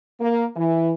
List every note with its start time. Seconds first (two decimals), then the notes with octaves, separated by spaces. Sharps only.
0.20 A#3
0.56 E3